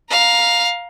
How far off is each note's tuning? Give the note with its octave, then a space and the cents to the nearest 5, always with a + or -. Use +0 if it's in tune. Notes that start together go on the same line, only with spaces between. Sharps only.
F5 +10 A#5 +15